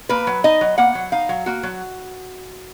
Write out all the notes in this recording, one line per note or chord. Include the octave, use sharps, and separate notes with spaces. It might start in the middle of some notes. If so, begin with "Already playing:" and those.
A#3 B4
F#3
D#4 D#5
F#3
A#3 F#5
F#3
D#4 F5
F#3
A#3 F#4
F#3